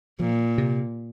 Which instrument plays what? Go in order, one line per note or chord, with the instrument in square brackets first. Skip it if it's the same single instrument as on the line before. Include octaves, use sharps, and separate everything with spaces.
[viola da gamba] A#2 [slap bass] F3
[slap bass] C3